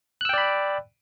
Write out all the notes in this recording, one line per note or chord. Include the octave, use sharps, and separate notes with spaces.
D5 G5 B5 E6 F#6